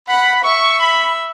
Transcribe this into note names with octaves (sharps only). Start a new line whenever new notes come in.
F#5 B5
E5 C#6
B5